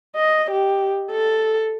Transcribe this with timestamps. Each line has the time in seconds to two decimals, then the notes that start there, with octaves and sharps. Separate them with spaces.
0.16 D#5
0.51 G4
1.12 A4